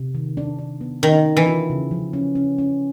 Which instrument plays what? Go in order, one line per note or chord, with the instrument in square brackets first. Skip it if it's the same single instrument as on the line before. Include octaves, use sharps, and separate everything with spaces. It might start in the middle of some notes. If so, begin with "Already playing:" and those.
Already playing: [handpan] C3
D#3
D4
D4
B3
[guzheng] D#3 [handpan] A#4
[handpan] D4
[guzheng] E3
[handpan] F4
C#3
F3
C#4
C#4
C#4